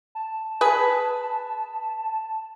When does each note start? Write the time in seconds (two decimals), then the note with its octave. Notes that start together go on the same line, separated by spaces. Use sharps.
0.15 A5
0.61 G#4 B4